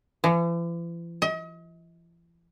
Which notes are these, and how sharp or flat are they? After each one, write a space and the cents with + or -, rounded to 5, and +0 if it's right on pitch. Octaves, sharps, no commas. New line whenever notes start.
E3 +45
D#5 +40